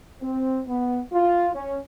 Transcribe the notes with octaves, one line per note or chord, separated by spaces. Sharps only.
C4
B3
F4
C#4